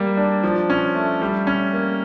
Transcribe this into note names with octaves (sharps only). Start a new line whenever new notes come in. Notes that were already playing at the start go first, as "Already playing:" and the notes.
Already playing: G3 A#3
D4
F3
C#4
A3
G3
C#4
A#3